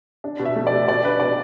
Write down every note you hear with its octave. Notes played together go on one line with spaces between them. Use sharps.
D4
B2
E5
A3
D5
B2
B2 D5
D4 B4
B2 D5